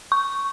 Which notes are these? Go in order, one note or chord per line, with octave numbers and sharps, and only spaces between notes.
C#6